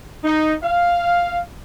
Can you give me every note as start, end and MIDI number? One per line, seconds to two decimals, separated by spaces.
0.24 0.54 63
0.62 1.41 77